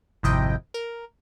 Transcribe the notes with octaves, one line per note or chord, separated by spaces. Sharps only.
G#1 F2 C3 E4 D#5 G5
A#4